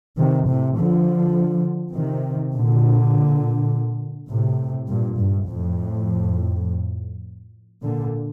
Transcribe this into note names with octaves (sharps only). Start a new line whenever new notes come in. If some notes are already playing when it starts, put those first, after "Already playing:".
C3 D#3
A2 C3
D3 F3
C3 D#3
A#2 D3
A2 C3
G2 A#2
G2
F2 A2
A#2 D3